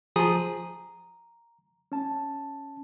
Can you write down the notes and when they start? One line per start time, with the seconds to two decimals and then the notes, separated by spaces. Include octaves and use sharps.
0.16 F3 G#4 A#5 D#6
1.92 C#4 A5